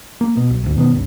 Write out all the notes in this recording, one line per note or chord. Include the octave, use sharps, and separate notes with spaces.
A#3
B2
B1
G#1 D2
B2 D#3 F#3 B3
G1 C#2